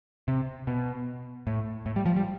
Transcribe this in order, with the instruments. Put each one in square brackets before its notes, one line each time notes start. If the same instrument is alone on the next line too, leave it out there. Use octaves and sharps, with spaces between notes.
[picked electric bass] C3
B2
A2
A2
G3
F3
G3